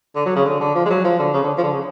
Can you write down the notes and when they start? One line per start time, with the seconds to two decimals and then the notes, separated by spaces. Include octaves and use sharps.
0.16 D3
0.26 F#3
0.36 C#3
0.45 D3
0.60 D3
0.75 F3
0.86 G#3
0.90 F#3
1.05 F3
1.19 D3
1.34 C#3
1.43 D3
1.58 F3
1.63 D3
1.73 C#3